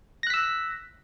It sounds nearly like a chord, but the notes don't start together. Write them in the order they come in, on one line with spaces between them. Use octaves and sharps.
A#6 F#6 B6 E6